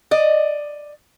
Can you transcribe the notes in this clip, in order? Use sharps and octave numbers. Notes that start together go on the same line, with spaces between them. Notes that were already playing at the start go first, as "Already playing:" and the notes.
D5 D#5